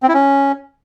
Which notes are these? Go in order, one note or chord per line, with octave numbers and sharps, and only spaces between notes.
C4
E4
C#4